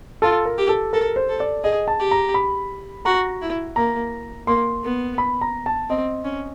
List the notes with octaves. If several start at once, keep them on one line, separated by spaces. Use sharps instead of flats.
F4 A4
A#4
G4
A4
A4 A#4
C5
A4
D5
G#4 D#5
A5
G4
A#5
B5
F#4 A#5
E4
A#3 A#5
A#3 C6
B3
B5
A#5
A5
C4 D#5
C#4